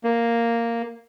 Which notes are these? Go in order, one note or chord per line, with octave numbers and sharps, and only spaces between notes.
A#3